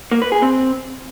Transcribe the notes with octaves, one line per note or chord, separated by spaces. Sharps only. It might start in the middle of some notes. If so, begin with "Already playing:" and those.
A#3
B4
G#4
C4